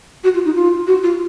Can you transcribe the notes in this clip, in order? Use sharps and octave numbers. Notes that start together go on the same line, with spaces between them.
F#4
F4
D#4
F4
F#4
F4